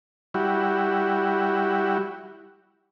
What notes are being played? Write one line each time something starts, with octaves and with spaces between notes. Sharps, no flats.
G3 E4 F#4